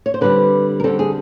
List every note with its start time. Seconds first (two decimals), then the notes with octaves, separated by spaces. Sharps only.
0.06 C#5
0.14 C5
0.21 D3 G3 C4 B4
0.80 A#4
0.84 D3 G3 C4 A4
0.99 G#4